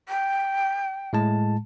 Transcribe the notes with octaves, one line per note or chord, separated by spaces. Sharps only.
G5
A2 G#3 A5